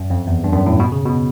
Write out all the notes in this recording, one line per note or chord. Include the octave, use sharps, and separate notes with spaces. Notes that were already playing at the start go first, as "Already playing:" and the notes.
Already playing: F#2
F2
E2
G2
F#2
A2
B2
C#3
B2